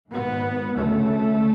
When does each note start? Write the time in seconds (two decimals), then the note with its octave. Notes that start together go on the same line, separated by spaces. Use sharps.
0.11 G#1 G#2 B3
0.75 D2 C#3 A3